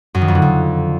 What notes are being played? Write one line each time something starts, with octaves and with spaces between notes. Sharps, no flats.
F#2
D#3
F2
D3
F2